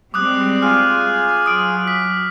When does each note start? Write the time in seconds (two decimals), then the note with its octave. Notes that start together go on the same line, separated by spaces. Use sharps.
0.14 G3 G#3 C4 D6 D#6 F#6
0.62 F4 G#4 G#5 F6
1.46 F#3 D#6 D7
1.88 B6